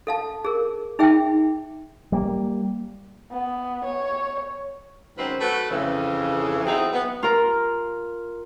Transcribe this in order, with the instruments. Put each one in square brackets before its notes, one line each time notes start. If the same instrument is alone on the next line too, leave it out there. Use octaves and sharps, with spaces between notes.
[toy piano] A4 F5 A5
G#4 A#4
D#4 G#4 E5 G5
[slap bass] G3 A#3
[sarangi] B3
C#5
[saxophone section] D#3 F#3 G#3 C4 C#4 B4
A3 F#4 B4
F2 C#3 E3
E2 F#3 C4 D#4 E4 G#4
B3
[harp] F4 A#4